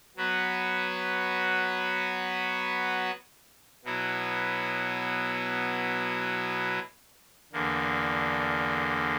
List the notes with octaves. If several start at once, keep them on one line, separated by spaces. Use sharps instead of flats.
F#3 B3 F#4 B4
B2 F#3 B3 E4
E2 D3 A#3